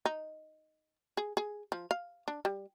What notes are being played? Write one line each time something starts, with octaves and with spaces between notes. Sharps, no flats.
D#4
G#4
G#4
F3
F5
D4
G3